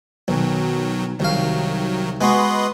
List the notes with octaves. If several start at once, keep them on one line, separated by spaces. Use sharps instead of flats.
B1 D#3 F#3
C2 D#3 F#3 F5
G#3 B3 F#4 B4 D#5 C6